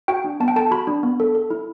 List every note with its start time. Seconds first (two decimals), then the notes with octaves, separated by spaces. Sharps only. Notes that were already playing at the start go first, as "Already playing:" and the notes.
0.08 F#4 G5
0.24 D4
0.40 B3 A5
0.48 G5
0.56 A4 A5
0.71 F#4 B5
0.87 D4
1.03 B3
1.20 A4
1.35 A4
1.50 E4